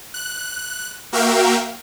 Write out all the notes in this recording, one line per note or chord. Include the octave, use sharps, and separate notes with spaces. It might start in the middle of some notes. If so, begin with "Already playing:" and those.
F#6
A#3 F#4 A#4 E5 F5 G5